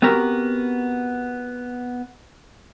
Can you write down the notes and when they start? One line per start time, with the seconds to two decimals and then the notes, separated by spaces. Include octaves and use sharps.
0.02 B3 C4 F#4 G4 A#4